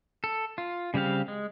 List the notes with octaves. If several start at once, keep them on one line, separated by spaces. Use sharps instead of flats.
A4
F4
C#3 G3 C4 G4 F5
G#3